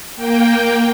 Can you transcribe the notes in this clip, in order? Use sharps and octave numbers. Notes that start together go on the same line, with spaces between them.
A#3 G5